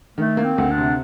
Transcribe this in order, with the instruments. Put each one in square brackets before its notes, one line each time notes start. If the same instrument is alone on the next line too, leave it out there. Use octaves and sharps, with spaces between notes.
[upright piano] D#3 [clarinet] A3
[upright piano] A#3
[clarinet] C4
[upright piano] D2
[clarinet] D4
[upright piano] C3